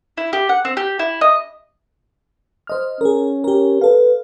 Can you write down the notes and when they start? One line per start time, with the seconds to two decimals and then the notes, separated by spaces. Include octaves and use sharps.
0.17 E4
0.33 G4
0.49 F#5
0.65 C4
0.77 G4
0.99 E4
1.21 D#5
2.67 C5 D#5 F6
3.01 C#4 G#4 A#4
3.44 G4 A#4
3.81 A4 B4 F5